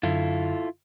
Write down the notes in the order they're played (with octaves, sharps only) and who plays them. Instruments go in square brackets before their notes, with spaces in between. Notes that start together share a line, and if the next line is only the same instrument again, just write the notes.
[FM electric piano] F#2 D3 [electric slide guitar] E4 F4 A4